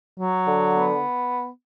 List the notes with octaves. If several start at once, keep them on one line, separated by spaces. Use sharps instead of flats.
F#3
D3
B3